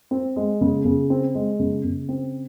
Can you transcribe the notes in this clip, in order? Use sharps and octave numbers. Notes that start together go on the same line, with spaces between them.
C4
G#3
C#3
C#3
C4
G#3
C#3
C#3
C4